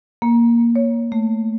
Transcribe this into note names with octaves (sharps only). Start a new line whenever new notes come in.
A#3
C#5
A3